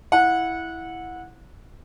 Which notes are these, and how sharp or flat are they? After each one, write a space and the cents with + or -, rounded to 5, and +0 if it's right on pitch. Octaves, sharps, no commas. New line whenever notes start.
E4 +0 F#5 -20